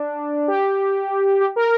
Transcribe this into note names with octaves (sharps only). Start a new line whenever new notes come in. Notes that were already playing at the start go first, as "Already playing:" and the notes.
Already playing: D4
G4
G4
A#4